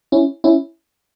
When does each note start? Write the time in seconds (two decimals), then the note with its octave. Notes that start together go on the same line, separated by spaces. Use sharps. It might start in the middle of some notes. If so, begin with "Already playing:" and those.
0.12 C#4 E4
0.44 C#4 E4